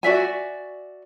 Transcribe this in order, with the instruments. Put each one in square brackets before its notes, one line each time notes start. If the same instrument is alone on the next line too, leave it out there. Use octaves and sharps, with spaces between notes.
[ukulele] F#4 D5 E5 G#5